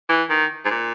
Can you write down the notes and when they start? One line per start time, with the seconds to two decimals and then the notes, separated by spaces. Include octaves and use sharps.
0.09 E3
0.30 D#3
0.65 G#2
0.70 A#2